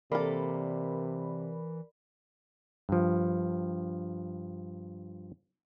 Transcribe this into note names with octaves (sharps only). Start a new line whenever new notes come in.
C3 E3 A#3 A4 A#4 D5 B5
G2 F3